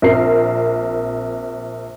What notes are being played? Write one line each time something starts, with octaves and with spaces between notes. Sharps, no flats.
A#1 C4 A#4 C7